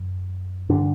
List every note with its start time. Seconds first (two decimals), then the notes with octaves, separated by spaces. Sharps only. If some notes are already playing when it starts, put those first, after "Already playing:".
Already playing: F#2
0.69 G2 D3 D4